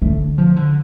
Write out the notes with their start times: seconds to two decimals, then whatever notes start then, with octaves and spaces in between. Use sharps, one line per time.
0.02 D3 A3
0.38 F3
0.56 D3